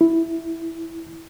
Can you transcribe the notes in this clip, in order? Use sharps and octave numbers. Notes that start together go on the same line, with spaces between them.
E4